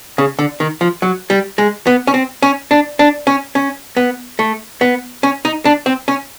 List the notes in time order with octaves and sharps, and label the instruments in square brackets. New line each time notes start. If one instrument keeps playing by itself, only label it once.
[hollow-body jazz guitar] C#3
D3
D#3
F3
F#3
G3
G#3
B3
C#4
C4
C#4
D4
D4
C#4
C#4
B3
A3
B3
C#4
D#4
D4
C4
C#4